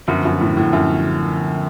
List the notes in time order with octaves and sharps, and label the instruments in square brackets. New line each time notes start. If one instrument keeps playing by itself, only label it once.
[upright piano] F#2 [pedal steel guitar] D3 F3 B3 F#4
[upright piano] F#2
A2
A2
F#2